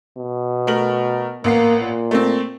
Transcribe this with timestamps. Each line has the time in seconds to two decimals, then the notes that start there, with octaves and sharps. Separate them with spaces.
0.18 B2
0.67 A3 A#4 F#7
1.44 A1 A#3 B3 C7
1.81 A#2
2.11 A3 A#3 C4